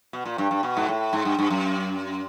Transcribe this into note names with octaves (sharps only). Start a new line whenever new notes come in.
B2
A#2
G2
G2
B2
G#2
A2
G#2
G2
G2
F#2